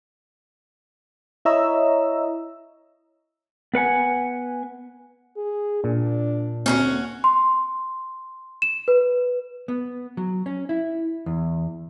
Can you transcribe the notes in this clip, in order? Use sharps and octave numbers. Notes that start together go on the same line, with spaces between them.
E4 C#5 D#5 E5 A#5 E6
B3 B4 F#5 G#5
G#4
A#2 D4
D2 A#3 C4 C#4 D#4 F#4
C6
E7
B4
B3
F#3
C#4
E4
E2